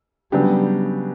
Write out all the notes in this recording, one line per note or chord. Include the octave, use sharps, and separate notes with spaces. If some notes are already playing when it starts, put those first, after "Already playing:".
C#3 F#3 G3 B3 D4 G4